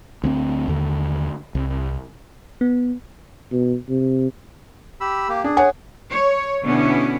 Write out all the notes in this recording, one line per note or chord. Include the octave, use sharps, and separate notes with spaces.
D2 B3 C4
D#2 D3
C2
B3
B2
C3
G4 B5 E6
A#3 G4
D4 G#4
C#5 F#5 G#5
C#5
B2 D3 B3 C#4 E4